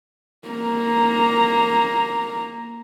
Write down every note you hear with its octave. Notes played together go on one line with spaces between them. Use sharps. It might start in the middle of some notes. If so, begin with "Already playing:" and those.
A#3 A#5